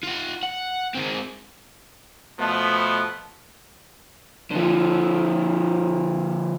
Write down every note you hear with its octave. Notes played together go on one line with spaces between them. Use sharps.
F4 F#5
F#5
G#3 C4
B2 F3 A3 B3
D3 F3